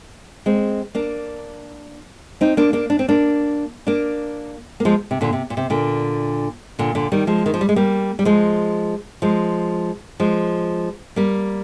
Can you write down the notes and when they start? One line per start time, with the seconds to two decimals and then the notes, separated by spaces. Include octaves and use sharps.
0.46 G#3 C4
0.95 A#3 D4
2.41 C4 D#4
2.57 A#3 D4
2.73 A#3 D4
2.90 D4
2.99 C4
3.09 A#3 D4
3.87 A#3 D4
4.80 A#3
4.85 F3 G#3
5.11 C3
5.21 A#2 D3
5.33 C3
5.50 A#2
5.57 C3
5.70 A#2 D3
6.79 A#2 D3
6.95 A#2 D3
7.12 D#3 G3
7.27 F3 G#3
7.46 D#3
7.54 F3
7.61 G3
7.69 G#3
7.76 G3 A#3
8.19 G3
8.25 F3 G#3
9.22 F3 G#3
10.20 F3 G#3
11.16 G3 A#3